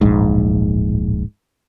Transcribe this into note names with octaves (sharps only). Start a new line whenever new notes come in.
D1 A#1 G#2